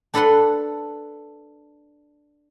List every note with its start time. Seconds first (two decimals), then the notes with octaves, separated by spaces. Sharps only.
0.14 D4 A4 B4 F#5 B5 C6